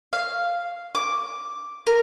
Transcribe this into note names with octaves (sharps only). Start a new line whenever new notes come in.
F5
D6
A#4